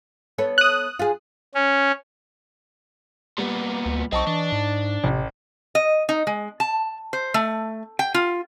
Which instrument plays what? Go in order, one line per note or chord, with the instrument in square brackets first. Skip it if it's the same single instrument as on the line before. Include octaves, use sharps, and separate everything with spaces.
[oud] B3 A4 C#5
[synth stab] D#6 F#6
[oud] F4 G#4
[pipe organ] C#4
[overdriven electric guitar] A#2 B3 [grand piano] G3
[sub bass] D2
[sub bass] B1 [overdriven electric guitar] C4 [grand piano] D#5 A5 C#6
[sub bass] E3 [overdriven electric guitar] D4
[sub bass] G#2
[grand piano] A1 [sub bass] C3
[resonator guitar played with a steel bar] D#5
D#4
G#3
A5
C5
A3
G5
F4